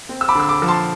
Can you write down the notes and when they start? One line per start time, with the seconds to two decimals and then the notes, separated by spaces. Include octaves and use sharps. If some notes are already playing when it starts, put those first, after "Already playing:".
0.09 C4
0.21 E6
0.29 B5 D6
0.35 D3 E6
0.48 B5 D6
0.62 F3
0.68 A5 C6